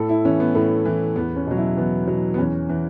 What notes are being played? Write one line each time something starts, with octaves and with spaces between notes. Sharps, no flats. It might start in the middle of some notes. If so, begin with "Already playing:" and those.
Already playing: A2 A4
E4
E3 C#4
B3
A2 A3
E3
E2 B3
C#4
B2 F#3
E4
E2 B3
B2 F#3
B3
E2 C#4
E3